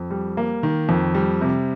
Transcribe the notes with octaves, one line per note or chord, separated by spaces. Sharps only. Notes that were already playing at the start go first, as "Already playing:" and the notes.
Already playing: F2
G3
A#3
D#3
F2
G3
C3